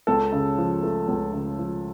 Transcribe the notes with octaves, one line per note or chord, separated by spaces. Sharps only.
C#2 A4
C#3
F3
A3
C#2
C#3
F3